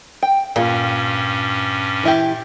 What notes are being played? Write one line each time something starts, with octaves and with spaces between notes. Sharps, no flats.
G5
G2 A#2 C#4
E3 E4 G4